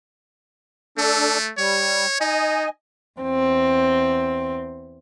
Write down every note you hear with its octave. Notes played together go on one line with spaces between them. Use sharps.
A3 D4 A4
G3 C#5
D#4 D#5 G#5
E2 C4